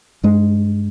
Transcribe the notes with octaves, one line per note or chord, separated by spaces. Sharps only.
G2 G#3